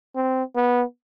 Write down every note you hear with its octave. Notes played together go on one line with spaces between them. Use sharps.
C4
B3